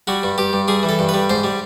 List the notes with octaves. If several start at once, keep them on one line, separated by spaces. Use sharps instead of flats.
G3 F#4
G2
G2 G4
G2
G3 G#4
E3
A4
G2
B4
G3
G#2 C5
G3